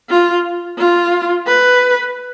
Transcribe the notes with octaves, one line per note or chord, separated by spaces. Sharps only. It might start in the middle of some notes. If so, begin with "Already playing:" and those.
F4
F4
B4